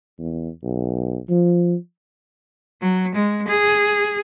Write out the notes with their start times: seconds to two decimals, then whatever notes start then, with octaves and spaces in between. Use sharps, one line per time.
0.19 E2
0.63 B1
1.30 F3
2.81 F#3
3.15 G#3
3.48 G#4